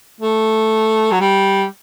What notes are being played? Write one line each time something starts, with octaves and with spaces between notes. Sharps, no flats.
A3
F#3
G3